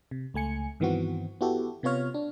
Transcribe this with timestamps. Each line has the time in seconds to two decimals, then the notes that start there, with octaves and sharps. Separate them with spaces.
0.11 C3
0.34 C#2 A3 G#5 C#7
0.80 G2 D#3 E3 B3 C4 F#4
1.41 B3 E4 F#4 G4 A4
1.83 C3 B3 F4 C#5 F6
2.14 D4